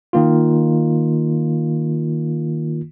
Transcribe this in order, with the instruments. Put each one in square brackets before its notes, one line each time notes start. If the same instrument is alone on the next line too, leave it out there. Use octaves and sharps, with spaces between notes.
[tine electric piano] D#3 A#3 F4